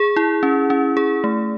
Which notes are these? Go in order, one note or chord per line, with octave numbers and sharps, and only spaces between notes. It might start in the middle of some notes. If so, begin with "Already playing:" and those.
Already playing: G#4
E4
C#4
C#4
G#4
A3